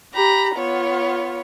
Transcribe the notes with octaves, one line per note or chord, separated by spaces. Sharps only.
G4 A#5 B5
B3 F4 C#5